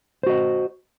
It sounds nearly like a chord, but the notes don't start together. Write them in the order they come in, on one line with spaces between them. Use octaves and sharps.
C5 F#4 D#5